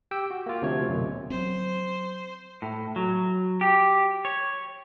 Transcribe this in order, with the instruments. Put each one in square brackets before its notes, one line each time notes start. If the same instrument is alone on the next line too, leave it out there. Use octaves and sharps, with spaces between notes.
[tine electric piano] G4 G5 E6
F#4
A#3 F4
D2 C3 F3 C#5
F#2 B2
[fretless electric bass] F#3 C4 [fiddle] C5
[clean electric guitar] A2
F#3
G4
C#5